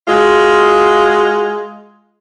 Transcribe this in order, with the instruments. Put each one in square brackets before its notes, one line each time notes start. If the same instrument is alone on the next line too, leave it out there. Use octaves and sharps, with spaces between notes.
[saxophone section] G#3 F4 F#4